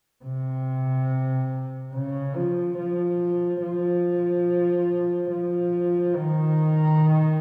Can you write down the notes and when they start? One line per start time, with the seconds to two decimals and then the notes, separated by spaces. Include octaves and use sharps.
0.25 C3
1.93 C#3
2.35 F3
2.78 F3
3.62 F3
5.31 F3
6.15 D#3